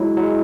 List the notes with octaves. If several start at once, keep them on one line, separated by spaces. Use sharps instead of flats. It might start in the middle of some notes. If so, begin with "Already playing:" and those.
Already playing: F#3 G#3 E4
F#3
G#3